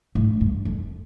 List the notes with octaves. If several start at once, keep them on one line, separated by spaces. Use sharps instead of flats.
A2
G2
F2